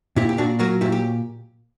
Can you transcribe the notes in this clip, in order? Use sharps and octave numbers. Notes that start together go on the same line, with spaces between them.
A#2 E4 G4
G4
A#2 D4 F#4
F#3 F#4 A#4
A#2 E4 G4
G4